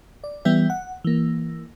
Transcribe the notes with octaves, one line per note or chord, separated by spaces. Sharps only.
D5
E3 G3 B3 G4 E5
F#5
E3 A#3